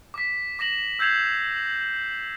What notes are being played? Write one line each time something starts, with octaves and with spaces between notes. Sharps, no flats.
D6 B6
D6 A#6 E7 F#7
E6 G6 G#6 C7 E7 F7